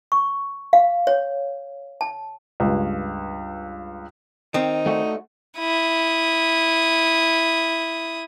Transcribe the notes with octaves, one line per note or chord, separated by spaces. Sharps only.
C#6
F5
C#5
A5
C#2 G2
D#3 C4 D#4
A3 F#4
E4 D#6